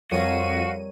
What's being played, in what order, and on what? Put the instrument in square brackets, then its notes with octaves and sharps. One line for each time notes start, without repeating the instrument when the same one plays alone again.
[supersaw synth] F2 D#7 [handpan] G3 A#4 C#5 [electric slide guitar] F#4 [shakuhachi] F5